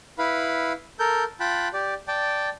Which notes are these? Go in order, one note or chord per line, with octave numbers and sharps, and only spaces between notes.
E4 B4 F5 B5
A4 A#4 G6
F4 G5 A5 B5 F#6
G4 D5
D5 G5 A5